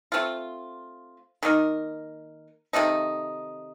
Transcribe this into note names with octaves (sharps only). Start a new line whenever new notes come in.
A3 C4 F4
D#3 A#3 D#4 A#4
C3 D#3 A3 D#4